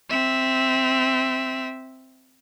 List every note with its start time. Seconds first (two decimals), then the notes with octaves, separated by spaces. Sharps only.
0.10 C4 E5